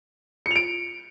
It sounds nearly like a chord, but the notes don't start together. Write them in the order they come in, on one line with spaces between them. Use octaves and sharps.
C#7 F7 D7